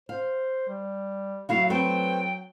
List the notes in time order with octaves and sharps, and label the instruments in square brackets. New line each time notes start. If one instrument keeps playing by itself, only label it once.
[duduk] C5 [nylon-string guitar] F5
[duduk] G3
[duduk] F#3 [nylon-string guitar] A3 E4 F#4 [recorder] F5
[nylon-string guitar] A3 C4 B4 [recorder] G5